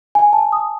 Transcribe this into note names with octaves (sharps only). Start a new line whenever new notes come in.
G#5
A5
D#6